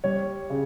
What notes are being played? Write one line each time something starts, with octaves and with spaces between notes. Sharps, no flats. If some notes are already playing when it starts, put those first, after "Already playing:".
G3 C#5
C#3